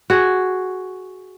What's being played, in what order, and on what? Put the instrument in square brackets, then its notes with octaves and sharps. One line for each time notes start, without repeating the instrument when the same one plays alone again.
[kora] F#4 G#4